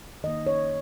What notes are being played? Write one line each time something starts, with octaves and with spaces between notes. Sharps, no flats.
D#3 A#3 D#5
C#5